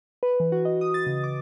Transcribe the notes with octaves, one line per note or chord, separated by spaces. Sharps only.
B4
E3
F#4
D#5
D#6
A6
C#3
D6